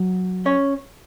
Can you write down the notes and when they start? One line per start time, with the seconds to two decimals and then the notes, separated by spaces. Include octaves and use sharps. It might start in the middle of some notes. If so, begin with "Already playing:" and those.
Already playing: F#3
0.46 C#4 C#5